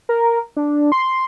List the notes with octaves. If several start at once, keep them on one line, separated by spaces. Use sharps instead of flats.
A#4
D4
C6